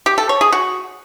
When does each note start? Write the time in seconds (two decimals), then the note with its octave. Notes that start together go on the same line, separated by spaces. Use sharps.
0.06 G4
0.18 A4
0.29 C#5
0.41 G#4
0.52 F#4